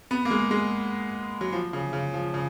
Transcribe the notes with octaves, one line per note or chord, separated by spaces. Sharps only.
B3
A#3
G#3
G#3
F#3
F3
C#3
C#3
F3
C#3